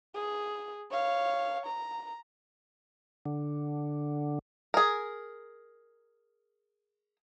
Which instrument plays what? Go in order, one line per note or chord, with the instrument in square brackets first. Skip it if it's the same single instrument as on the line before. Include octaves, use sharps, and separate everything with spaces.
[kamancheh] G#4
C#5 F5
A#5
[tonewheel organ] D3
[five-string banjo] G#4 A#4